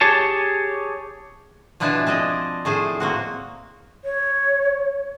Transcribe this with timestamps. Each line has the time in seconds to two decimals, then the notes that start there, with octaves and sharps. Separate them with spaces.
0.01 G4 G#4 C#5 A5
1.80 B2 F3 D4 E4 B4 G#5
2.07 C4 D4 D#5
2.65 A2 A3 G#4 C5
3.00 A#3 C4 F#4
4.04 C#5